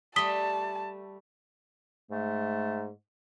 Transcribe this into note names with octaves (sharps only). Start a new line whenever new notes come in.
G3 A3 A5 D#6 B6 G7
G#2 A3